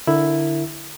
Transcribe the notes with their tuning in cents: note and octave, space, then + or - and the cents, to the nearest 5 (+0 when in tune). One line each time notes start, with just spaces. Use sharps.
D3 +0 E4 +0 A#4 -15